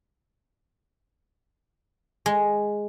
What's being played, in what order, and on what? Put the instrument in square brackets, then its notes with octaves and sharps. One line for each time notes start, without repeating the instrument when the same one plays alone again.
[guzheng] G#3